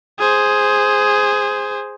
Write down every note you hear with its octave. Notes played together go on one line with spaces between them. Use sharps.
G#4 C5